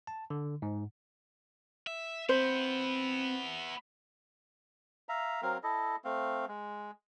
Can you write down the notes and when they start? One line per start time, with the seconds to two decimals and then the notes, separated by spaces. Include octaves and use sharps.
0.07 A5
0.30 D3
0.62 G#2
1.87 E5
2.29 B3 C4 E4 C5
5.09 E5 F5 A#5
5.42 F#3 C4 A#4 F5
5.63 E4 A4 D#5
6.04 A3 C4 F5
6.48 G#3